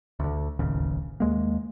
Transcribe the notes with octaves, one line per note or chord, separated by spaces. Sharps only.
D2 D3
D1 A1 D#2 C#3
D#2 G#3 A#3